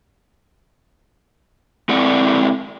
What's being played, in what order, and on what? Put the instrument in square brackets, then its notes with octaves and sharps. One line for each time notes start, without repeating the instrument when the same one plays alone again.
[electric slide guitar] G#3 C4 E4 A4 D5 F#5